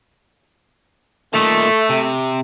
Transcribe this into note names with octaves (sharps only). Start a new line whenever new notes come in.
A#2 D#3 A3
C3